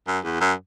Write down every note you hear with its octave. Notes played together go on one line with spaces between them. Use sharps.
F#2
E2
F#2